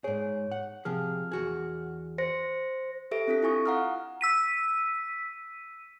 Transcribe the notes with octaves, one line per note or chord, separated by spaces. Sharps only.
G#2 G#4 C#5
F#5
C3 F3 G#4 F6
E2 F#4 G#4
C5 A#6 C#7
G4 A4 B4 E5 A#6 D7
C4 D4 F4 A4 B6
E4 F4 G#5 C#6 D#6
F5 F#5 A#5 D#6 F6
E6 B6 D#7